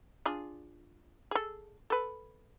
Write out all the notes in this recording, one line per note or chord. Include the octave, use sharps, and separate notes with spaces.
D4 F4 G#4
G#4 A4
A4 B4